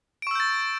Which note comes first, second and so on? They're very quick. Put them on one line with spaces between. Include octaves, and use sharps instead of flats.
D7 C#6 E6 G6 A6